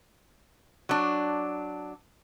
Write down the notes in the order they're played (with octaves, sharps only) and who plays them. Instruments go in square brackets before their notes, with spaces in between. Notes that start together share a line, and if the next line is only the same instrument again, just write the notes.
[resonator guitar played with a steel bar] F#3 D4